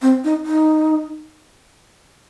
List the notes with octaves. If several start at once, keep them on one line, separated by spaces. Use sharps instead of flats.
C4
D#4
D#4